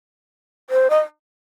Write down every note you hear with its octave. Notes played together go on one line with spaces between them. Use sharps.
C5
D#5